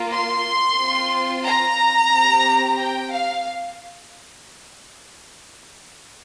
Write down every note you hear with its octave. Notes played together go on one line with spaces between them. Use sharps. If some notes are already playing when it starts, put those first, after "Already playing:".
Already playing: A#3 F4
C6
C4 F4
A#5
C4 G4
G5
F5